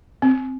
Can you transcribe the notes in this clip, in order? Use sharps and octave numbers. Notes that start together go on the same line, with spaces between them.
C4